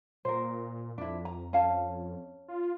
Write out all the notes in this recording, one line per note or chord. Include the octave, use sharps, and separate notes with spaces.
A#2 A#4 C5
F2 D4 E4
A#5
C#4 F5 A5
F4